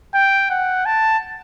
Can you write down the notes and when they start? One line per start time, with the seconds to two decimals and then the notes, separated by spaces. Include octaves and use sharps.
0.14 G5
0.50 F#5
0.86 A5